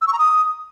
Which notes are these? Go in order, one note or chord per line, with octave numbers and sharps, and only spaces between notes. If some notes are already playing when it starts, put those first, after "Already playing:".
E6
C#6
A#5
D#6